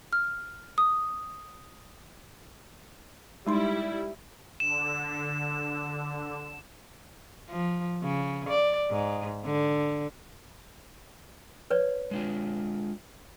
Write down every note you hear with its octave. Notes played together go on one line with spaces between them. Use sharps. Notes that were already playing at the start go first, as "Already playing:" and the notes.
F6
D#6
G3 G#3 D#4 E4 C6
D3 E7
F3
C#3
D5
G#2
D3
B4 C#5 D5
G#3 D4 F4